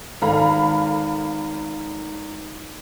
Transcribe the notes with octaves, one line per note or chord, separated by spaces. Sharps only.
G#1 A4 F5 A#5 B5